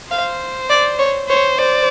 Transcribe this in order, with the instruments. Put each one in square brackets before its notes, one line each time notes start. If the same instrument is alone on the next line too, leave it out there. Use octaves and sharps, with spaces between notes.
[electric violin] C5 [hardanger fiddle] F5
[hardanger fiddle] D5
C#5
[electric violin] C5 [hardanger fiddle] C#5
[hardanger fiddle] C5 [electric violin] D5